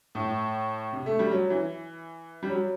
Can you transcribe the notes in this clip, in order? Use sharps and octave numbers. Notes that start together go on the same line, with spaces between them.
A2
C3
A3
G3
F#3
E3
G3
F#3